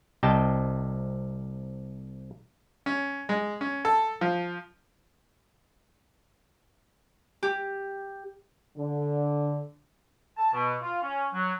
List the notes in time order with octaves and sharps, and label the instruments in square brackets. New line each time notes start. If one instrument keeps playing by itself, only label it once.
[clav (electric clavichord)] C2 C3 D#5 G5 A5
[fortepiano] C#4
G#3
C#4
A4
F3
[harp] G4
[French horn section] D3
[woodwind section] A5
B2
F4
C#4
F#3